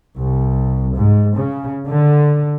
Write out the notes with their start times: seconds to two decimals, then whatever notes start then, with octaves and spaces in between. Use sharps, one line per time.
0.17 C2
0.95 G#2
1.35 C#3
1.88 D3